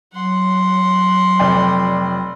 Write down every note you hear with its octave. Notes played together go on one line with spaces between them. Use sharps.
F#3 F#5 C6
F1 D5 G5